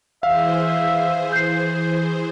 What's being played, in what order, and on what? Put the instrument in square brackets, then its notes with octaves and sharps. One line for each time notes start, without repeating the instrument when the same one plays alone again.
[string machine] E3 G#4 C5 [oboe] E5 [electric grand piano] F5
[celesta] G6 C7